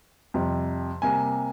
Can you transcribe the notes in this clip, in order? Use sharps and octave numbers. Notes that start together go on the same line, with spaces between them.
F2 C3 G3
C3 G3 A#3 G#5